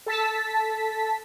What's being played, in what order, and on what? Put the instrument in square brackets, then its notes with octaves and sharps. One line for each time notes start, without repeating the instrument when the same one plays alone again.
[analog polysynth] A4 A5 B6